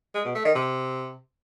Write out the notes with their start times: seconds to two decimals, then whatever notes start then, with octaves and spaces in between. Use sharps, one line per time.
0.14 G#3
0.25 B2
0.35 A3
0.45 D#3
0.55 C3